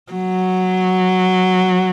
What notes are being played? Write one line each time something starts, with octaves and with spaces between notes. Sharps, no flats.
F#3